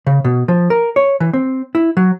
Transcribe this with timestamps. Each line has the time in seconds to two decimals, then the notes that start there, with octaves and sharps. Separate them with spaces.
0.07 C#3
0.24 B2
0.48 F3
0.70 A#4
0.96 C#5
1.20 E3
1.33 C4
1.75 E4
1.97 F#3